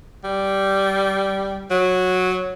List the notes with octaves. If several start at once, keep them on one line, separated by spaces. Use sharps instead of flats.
G3
F#3